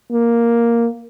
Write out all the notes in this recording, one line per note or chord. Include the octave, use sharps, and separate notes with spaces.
A#3